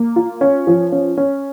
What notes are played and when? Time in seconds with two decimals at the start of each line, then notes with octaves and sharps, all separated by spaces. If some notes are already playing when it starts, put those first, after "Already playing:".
Already playing: A#3
0.16 F4
0.41 C#4
0.67 F3
0.92 C#4
1.17 C#4